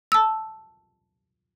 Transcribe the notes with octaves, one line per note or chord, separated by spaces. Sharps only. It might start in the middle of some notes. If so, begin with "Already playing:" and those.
A5 E6